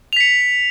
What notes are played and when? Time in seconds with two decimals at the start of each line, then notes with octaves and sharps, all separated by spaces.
0.13 F7
0.17 B6
0.20 C#7